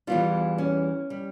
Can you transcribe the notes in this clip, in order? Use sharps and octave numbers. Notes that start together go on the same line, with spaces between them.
E2 E3 G3 F4
C#4
G3